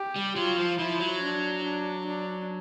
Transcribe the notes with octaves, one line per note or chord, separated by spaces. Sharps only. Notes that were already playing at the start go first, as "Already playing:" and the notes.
Already playing: G4
G3
F#3 F4
F3
F3 E4
F#3
D4
D4
D4